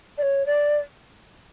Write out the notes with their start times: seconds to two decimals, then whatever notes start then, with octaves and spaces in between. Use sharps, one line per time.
0.18 D5
0.22 C#5
0.46 D5